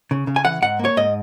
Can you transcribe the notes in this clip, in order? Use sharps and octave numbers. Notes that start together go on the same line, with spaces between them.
C#3
C#3
G#5
E3 F#5
G#2 F#5
A#3
C#5
G#2 D#5